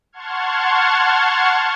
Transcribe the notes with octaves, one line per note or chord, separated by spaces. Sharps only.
F#5 A5 C6 C#6 F6 G#6